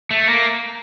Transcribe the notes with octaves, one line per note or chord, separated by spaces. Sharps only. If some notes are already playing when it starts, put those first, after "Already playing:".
A3
A#3